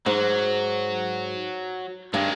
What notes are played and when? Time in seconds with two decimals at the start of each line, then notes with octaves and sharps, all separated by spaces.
0.06 G#2 F#3
2.14 G2 D#3 G#3